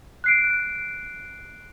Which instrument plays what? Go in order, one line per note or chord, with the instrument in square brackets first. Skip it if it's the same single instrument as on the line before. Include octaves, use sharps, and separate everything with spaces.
[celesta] F#6 C7 D7